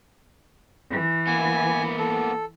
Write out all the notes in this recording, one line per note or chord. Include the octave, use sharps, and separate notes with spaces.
E3
A#3 B3 G#5
A4